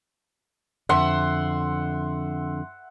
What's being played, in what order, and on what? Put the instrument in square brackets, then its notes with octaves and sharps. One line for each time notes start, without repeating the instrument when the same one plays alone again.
[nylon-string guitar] F2 D3 [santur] E5 F#5 C6